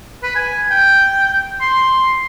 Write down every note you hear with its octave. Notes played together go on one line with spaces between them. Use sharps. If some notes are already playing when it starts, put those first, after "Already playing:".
B4
G#5
G5
C6